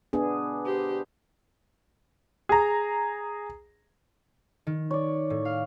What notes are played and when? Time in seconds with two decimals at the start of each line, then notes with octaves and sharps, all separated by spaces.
0.13 B3 D4 G#4
0.66 G4 C5
2.49 G#4 A#5
4.67 D#3
4.91 C#5 D5
5.30 A2
5.45 F5